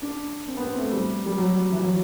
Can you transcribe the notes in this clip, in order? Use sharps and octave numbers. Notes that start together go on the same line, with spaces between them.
D4
C4
B3
C4
A3
G3
G3
F#3
E3
F#3